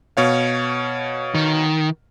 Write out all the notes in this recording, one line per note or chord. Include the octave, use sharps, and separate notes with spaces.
B2 C#5 F5
D#3